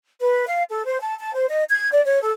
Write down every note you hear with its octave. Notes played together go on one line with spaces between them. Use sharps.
B4
F5
A4
C5
A5
A5
C5
D#5
G#6
D5
C#5
A4